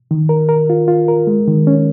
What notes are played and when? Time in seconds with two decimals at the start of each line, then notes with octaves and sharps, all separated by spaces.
0.11 D#3
0.29 A#4
0.49 A#4
0.70 F4
0.88 F4
1.08 A#4
1.27 G#3
1.48 D#3
1.67 C#4